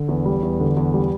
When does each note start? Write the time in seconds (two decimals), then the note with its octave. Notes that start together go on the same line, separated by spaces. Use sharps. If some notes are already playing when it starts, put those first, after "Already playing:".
Already playing: D3
0.09 E2
0.25 G3
0.43 E2
0.60 D3
0.77 E2
0.94 G3